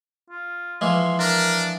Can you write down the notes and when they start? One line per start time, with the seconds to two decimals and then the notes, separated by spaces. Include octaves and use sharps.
0.30 F4
0.81 E3 F3 G#3 C6
1.20 D4 A#4